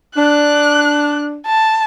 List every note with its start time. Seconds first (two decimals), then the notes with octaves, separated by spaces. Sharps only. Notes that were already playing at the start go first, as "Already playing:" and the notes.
0.16 D4 F#6
1.46 A5